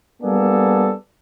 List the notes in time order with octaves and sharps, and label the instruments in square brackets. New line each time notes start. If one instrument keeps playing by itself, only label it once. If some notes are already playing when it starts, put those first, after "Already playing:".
[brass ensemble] G3 A#3 B3 D4 G#4 A4